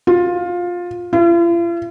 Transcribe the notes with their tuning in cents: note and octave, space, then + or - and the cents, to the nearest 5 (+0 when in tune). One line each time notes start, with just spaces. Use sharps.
F4 +15
F4 -45